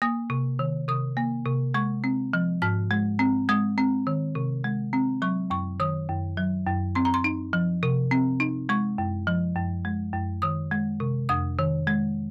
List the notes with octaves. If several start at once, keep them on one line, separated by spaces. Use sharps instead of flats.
A#3 D#6
C3
D#3
C3 D#6
A#3
C3
G#3 C#6
C4
F3
G#2 F6
G#3
C4
G#3 D#6
C4
D#3
C3
G#3
C4
F#3 C#6
F#2 C#6
D#3 D#6
F#2
F#3
F#2
C4 C6
A#5
C6
D#4
F3
C3
C4
D#4
G#3 C#6
F#2
F3
F#2
G#3
F#2
D#3 D#6
G#3
C3
F2 D#6
D#3
G#3